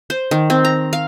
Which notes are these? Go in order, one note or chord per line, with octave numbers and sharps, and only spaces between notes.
C5
D#3
C4
A#5
F5